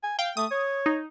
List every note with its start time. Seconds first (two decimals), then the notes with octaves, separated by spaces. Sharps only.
0.04 G#5
0.19 F5 G5
0.37 A3 D#6
0.51 C#5
0.86 D#4